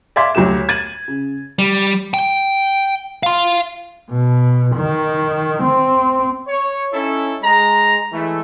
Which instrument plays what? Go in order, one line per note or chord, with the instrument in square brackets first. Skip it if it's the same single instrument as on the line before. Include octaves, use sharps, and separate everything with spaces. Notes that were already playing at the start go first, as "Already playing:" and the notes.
[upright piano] D5 E5 F5 C6 G#6 B6
D2 F#3 G4 E7
G#6 A6 D#7 F#7
C#3
[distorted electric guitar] G3
G5
F5 C6
[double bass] B2
D#3
C4
[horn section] C#5
C#4 D#4 E4 A4
G#3 A#5
E3 G#3 A3